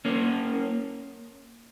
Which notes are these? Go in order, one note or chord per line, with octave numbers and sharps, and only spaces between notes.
A#3 C#4